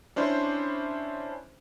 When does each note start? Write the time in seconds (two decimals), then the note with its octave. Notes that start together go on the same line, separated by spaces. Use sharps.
0.16 C#4 D4 E4 C5